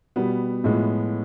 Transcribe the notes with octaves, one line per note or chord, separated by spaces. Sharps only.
B2 G3 B3
A2 F3 G#3 B3